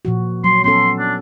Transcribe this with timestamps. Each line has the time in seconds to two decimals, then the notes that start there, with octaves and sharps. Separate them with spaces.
0.05 A#2 F3 F#4
0.44 F#3 C6
0.64 B3 C#4 A4 C6
0.99 D4